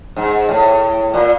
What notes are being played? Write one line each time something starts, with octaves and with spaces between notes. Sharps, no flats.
G#2
A2
A#2